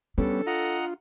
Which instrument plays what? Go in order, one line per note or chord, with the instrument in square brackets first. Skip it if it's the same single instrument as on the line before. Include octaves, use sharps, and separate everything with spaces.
[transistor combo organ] G3 B3 C#4 [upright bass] D4 [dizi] A4
[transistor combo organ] F4 [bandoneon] D#5 F#5 A#5